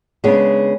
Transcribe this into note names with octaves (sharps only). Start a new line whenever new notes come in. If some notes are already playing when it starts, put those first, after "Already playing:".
C#3 G#3 B3 D4